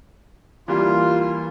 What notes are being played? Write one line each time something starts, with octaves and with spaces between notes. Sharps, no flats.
E3 G3 A#3 F4